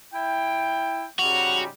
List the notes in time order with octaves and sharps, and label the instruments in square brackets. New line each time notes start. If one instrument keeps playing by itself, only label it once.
[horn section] E4 G5
[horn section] G#2 C#3 G3 [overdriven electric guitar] F#4 [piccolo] F7